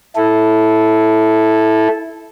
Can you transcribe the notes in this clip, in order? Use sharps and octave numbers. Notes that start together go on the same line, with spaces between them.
E4 A4